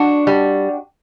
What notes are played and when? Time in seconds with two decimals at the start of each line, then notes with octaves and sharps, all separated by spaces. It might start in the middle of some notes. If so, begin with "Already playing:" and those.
Already playing: D4 F#4
0.27 G3